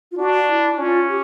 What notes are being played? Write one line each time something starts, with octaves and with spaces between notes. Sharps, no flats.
F4
D4 F#4
E4
C#4 F4
G4